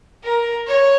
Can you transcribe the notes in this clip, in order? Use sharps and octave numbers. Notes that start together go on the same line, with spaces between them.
A#4
C#5